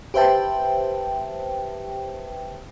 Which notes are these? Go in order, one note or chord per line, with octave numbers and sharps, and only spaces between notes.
G4 B4 C5 E5 G5 A5